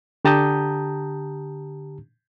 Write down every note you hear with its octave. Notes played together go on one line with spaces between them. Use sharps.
D3 G4 A5 A#5 D#6 G6